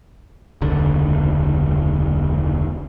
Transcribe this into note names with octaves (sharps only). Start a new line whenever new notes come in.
E1 C#2 D3